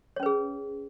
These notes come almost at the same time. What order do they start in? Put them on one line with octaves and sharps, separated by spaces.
C#5 C#4 B4 G#4